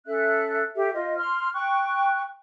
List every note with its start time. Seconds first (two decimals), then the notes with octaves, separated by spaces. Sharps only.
0.05 C#4 A4 E5 F#6
0.74 G4 A4 E5
0.93 F4 C5 D#5
1.18 C6 F6
1.53 G5 C#6 F#6